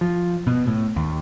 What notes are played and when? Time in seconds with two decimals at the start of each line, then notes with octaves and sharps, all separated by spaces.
0.01 F3
0.47 B2
0.67 A2
0.96 D#2